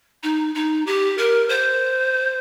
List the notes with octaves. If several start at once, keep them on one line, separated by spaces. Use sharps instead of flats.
D#4
D#4
G4
A#4
C5